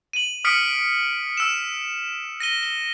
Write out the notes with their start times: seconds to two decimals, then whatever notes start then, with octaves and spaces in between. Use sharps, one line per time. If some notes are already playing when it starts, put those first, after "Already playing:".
0.13 D#7 F#7
0.45 D#6 F6 B6 C#7 D7
1.37 E6 E7
2.40 A#6 D#7 G7
2.63 G7